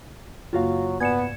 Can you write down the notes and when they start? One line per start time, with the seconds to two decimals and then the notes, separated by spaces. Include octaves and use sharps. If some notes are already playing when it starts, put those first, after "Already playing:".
0.53 F#2 C#3 F#3 A#3 F4 F#4 F5
1.00 G#2 B3 D5 G#5 G#6 C#7 E7